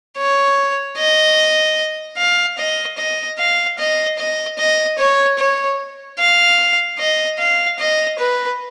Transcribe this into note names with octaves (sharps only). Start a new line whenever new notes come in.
C#5
D#5
F5
D#5
D#5
F5
D#5
D#5
D#5
C#5
C#5
F5
D#5
F5
D#5
B4